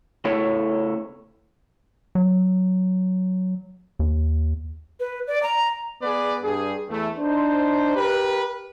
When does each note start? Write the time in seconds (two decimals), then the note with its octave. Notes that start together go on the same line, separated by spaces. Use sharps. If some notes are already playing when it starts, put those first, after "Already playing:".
0.25 C#3 A3 E4 A4 C#5
2.15 F#3
3.99 D#2
5.00 B4
5.27 D5
5.43 A#5
6.02 B3 G#4 B4 D5
6.43 G2 G3 G#4
6.89 E2 E3 A3
7.18 D4 D#4 C5
7.96 G4 A#4 B4